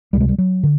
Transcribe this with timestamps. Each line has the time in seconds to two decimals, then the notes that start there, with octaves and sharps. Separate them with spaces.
0.13 C#2 G3
0.17 C3 G#3
0.29 G3
0.38 F#3
0.63 D3